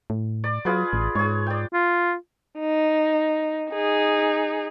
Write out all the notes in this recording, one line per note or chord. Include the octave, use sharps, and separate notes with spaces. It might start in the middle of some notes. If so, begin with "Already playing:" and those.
A2
D5
F#3 F4 G#4 B4
A1
G#2 G#4 C#5
D5 G5
F4
D#4
D#4 G#4